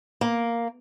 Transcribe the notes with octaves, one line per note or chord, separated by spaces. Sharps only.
A#3